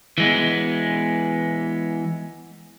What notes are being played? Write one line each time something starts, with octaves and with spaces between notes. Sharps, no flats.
E3 G#3 B3